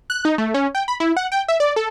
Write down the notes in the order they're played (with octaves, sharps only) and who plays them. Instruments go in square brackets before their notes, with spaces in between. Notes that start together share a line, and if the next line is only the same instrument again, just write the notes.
[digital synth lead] F#6
D#4
A3
C#4
G5
B5
E4
F#5
G5
E5
D5
A4